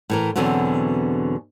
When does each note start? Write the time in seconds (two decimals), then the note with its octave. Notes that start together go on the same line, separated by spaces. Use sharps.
0.10 A2 E3 A#4
0.36 E2 B2 D3 E3 F#3 C4